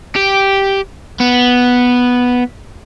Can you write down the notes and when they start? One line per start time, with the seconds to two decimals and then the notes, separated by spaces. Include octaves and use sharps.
0.16 G4
1.20 B3